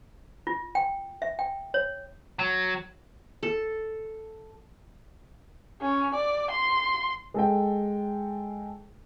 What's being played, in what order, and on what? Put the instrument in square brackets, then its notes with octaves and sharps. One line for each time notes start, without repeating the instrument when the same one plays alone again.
[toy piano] F4
G5
E5
G5
C#5
[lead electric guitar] F#3
[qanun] A4
[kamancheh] C#4
D5
C6
[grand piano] G#3 A4 G5